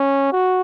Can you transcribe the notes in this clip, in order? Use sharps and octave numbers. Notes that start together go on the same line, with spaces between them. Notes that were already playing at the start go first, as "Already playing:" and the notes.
Already playing: C#4
F#4